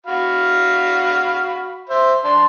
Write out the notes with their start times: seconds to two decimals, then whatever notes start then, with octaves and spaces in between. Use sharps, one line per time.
0.06 F#4 F5 B5
1.89 C5 E5
2.24 D4 C6